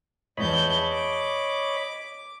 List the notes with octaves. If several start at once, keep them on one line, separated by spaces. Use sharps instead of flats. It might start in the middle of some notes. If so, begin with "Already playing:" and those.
E2 C#5 D#5 A5 B5 G6
D6